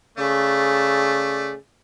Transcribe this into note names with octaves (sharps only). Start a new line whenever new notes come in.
C#3 A3 G#4 D5